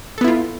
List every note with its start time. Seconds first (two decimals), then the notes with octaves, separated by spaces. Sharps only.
0.18 A4
0.21 B3
0.24 E4
0.28 F4